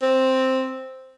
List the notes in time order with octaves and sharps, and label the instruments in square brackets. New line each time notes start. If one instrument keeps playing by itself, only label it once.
[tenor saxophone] C4